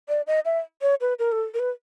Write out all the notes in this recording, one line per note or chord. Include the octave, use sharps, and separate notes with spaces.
D5
D#5
E5
C#5
B4
A#4
A4
A#4
B4